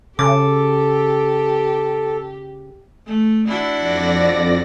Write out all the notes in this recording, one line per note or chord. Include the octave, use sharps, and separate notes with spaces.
C#3 G4 A4 D6
A3
D4 E4 F#4
F2 D5 A#6